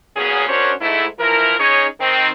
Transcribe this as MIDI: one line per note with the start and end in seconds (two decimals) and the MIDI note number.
0.16 0.48 46
0.16 0.48 54
0.16 0.48 59
0.16 0.48 61
0.16 0.48 68
0.48 0.73 61
0.48 0.73 62
0.48 0.73 66
0.48 0.73 70
0.48 0.73 72
0.48 0.73 73
0.81 1.06 44
0.81 1.06 57
0.81 1.06 64
1.19 1.58 52
1.19 1.58 53
1.19 1.58 64
1.19 1.58 70
1.59 1.87 61
1.59 1.87 63
1.59 1.87 68
1.59 1.87 73
2.00 2.30 51
2.00 2.30 60